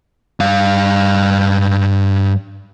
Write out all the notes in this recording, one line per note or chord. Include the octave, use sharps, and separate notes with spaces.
G2 F5